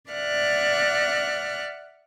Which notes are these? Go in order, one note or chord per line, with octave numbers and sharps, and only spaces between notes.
D5 E5 F#5 F6 F#6